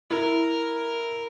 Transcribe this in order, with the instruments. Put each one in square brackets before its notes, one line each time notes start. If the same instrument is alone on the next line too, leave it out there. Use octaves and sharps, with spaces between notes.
[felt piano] E4 [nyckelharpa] A#4